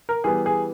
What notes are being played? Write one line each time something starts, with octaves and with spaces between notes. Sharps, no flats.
A#4
E3 G3 B3 G#4
G#4